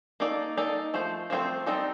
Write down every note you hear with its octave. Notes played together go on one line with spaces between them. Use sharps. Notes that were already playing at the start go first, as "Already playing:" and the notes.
A#3 D#4 A4 D5
A#3 D#4 A4 D5
F3 A3 C5
F3 A3 C4 F4 C5
G3 C4 D#4 A4